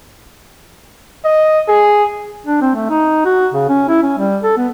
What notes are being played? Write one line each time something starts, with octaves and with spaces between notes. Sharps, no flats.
D#5
G#4
D4
C4
A3
D#4
F#4
C#3
C#4
E4
C#4
G3
A4
B3